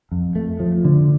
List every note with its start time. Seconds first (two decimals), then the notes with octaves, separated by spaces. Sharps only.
0.12 F2
0.36 A3
0.60 F3
0.85 D3